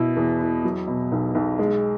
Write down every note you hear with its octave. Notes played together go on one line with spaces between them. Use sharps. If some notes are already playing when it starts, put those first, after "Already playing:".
Already playing: B2 B3 E4
E2
E4
F#3
B2
B1
B1
G#3